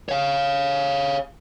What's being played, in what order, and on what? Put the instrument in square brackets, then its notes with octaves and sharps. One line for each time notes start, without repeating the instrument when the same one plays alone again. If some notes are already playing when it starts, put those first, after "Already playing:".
[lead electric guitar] C#5 F5